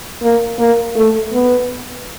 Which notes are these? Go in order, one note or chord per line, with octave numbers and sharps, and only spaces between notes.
A#3
A#3
A3
B3